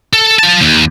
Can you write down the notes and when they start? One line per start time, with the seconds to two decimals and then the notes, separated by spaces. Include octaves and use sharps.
0.13 A4
0.39 F4 A5
0.61 D#2